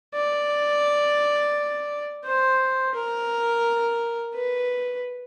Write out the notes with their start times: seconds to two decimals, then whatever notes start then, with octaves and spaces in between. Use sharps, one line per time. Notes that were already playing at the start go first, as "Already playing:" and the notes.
0.15 D5
2.25 C5
2.94 A#4
4.35 B4